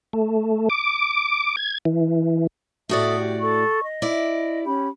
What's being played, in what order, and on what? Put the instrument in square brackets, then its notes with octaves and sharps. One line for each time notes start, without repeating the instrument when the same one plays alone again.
[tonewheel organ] A3
D6
G#6
E3
[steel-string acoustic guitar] A2 F#4 D5 [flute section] A4 E5 D#6
[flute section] G4
A4 C#6
D#5
[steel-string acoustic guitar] E4 D5
[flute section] C#4 G4 B5